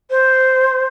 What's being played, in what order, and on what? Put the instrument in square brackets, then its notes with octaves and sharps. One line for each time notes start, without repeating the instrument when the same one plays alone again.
[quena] C5